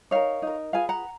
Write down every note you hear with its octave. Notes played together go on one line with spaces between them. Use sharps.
D#4 A#4 C#5 F5
D#4 A#4
F4 G#4 B4 F5 G#5
F#5 A#5